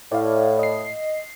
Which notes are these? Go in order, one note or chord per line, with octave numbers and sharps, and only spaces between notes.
A2 D5 F5
D#5 C7